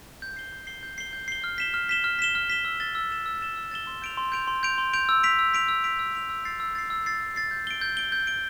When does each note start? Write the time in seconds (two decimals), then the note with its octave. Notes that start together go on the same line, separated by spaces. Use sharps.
0.22 G6
0.36 C7 G7
0.53 G6
0.67 C7 G7
0.83 G6
0.98 C7 G7
1.13 G6
1.28 C7 G7
1.44 F6
1.58 B6 E7 G7
1.74 F6
1.89 B6 E7 G7
2.04 F6
2.19 B6 E7 G7
2.35 F6
2.50 B6 E7 G7
2.65 E6
2.80 A6 E7 G7
2.95 E6
3.11 A6 E7 G7
3.26 E6
3.41 A6 E7 G7
3.56 E6
3.71 A6 E7 G7
3.87 C6
4.02 G6 D7 F7
4.17 C6
4.32 G6 D7 F7
4.48 C6
4.63 G6 D7 F7
4.78 C6
4.93 G6 D7 F7
5.09 E6
5.24 B6 D7 F7
5.39 E6
5.54 B6 D7 F7
5.68 E6
5.84 B6 D7 F7
5.99 E6
6.15 B6 D7 F7
6.30 E6
6.45 A6 C7
6.60 E6
6.75 A6 C7
6.90 E6
7.06 A6 C7
7.21 E6
7.36 A6 C7
7.51 G6
7.67 D7 G7
7.81 G6
7.97 D7 G7
8.12 G6
8.27 D7 G7